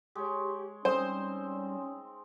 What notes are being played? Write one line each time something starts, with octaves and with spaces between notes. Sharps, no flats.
G#3 G4 C#5
G3 C4 C#4 D#4 C5